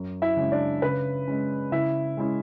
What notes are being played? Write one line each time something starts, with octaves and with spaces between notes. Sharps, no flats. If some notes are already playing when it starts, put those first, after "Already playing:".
Already playing: F#2
E4 E5
C#3 G#3 C#4
D4 D5
C#3 B4
G#3 C#4
C#3 E4 E5
G#3 C#4 E4